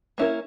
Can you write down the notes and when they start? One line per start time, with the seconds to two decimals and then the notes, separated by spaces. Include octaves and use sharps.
0.18 A#3 C#4 E4 A#4